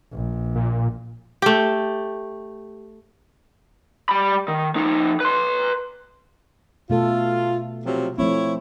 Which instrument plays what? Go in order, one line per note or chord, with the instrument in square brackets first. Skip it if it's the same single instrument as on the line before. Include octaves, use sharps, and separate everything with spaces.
[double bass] A#1
[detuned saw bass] A#2
[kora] A3 G4
[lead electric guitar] G3 B5
D#3
F3 D#4
B4 C6
[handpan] B2 A3 A4 [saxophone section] F4
[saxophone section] C3 F3 F#3
[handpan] F3 A3 C4 [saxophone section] E4 C#5